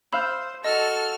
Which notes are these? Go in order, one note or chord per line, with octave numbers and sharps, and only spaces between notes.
C5 F5 B5 E6 G6
F#4 A4 D#5 F6